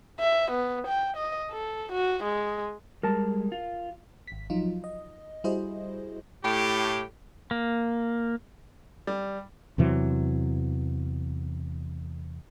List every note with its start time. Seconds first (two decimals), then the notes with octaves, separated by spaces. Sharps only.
0.20 E5
0.51 B3
0.87 G5
1.16 D#5
1.51 A4
1.92 F#4
2.24 G#3
3.03 G3 G#3 A#4 A5
3.52 F4
4.27 G#1 B6
4.50 F3 F#3 D#4 F4
4.84 D#5
5.44 G3 E4 F#4 G#4 C5 D#5
6.44 A2 G4
7.51 A#3
9.07 G3
9.78 E2 C3 E3 F#3